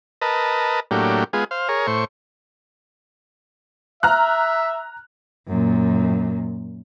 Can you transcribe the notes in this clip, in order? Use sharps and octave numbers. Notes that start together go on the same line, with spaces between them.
A#4 B4 D#5 A5
A2 F#3 A#3 D4 G4
G#3 B3 F4 G#4
C5 F5
G#4 A#4 C#5
A2 C5 C#6
E5 A#5 F6 F#6
F#2 A#2